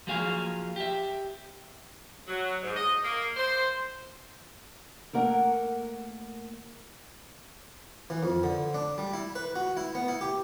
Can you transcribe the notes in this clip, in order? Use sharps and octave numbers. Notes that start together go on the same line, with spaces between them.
F3 F#3 A#3 G#4 F5 G#5
G4 E5
F#3
G#2
D#5
A#3
C5
A3 A#3 A#4 F#5
E3
F2
D3
D4
G3
E4
B4
F#4
E4
B3
E4
G4